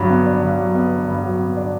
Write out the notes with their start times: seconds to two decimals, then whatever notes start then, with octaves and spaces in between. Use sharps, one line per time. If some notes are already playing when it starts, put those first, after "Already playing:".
Already playing: G2 F#3
0.10 B3
0.26 D4
0.43 G2
0.59 F#3
0.75 B3
0.91 D4
1.08 G2
1.24 F#3
1.40 B3
1.56 D4